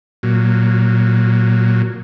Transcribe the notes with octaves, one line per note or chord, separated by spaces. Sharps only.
A#2 F#3